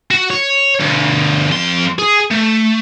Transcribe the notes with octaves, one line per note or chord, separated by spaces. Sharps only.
F#4
C#5
D2 G2
F2 C6
G#4
A3